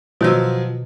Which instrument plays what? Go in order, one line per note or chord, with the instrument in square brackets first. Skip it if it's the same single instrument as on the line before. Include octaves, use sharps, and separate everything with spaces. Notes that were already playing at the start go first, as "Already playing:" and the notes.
[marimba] B2 D#3 E6 [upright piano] F3 F#3